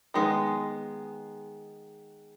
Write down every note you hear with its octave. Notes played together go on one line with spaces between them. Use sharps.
D#3 G#3 B3